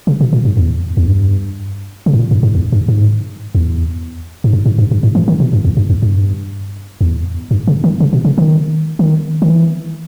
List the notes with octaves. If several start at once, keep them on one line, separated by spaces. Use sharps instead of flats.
C#3
B2
A#2
G2
E2
E2
G2
C#3
G#2
A#2
G2
G#2
E2
G2
G#2
E2
G#2
G2
G#2
G2
G2
G#2
E3
D#3
B2
G2
E2
G2
E2
G2
E2
G2
C#3
D#3
C#3
B2
C#3
D#3
D#3
D#3
E3